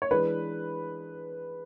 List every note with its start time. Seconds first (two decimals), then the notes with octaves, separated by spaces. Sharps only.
0.02 C#5
0.11 E3 G#3 D4 B4